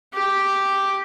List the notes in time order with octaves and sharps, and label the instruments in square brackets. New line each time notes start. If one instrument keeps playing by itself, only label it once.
[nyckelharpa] G4